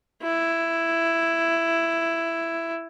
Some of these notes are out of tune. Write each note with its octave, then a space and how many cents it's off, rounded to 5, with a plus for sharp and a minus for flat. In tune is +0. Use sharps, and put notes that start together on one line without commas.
E4 +10